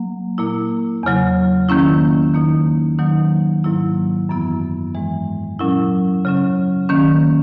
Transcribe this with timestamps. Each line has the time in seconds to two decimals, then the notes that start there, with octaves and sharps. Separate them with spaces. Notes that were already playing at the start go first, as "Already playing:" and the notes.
Already playing: F#3 A#3
0.38 A#2 A#3 E4
1.03 E2 C#3 F#3
1.69 D#3 A#3 C#4 E4
2.34 D#3 A#3 D#4
2.98 D#3 F#3 A#3 D#4
3.64 G#2 F#3 A#3 E4
4.29 F#2 E3 B3 E4
4.95 G#2 E3 G#3
5.59 A#2 F#3 C#4 E4
6.25 C#3 F#3 C#4
6.89 D#3 A#3 C#4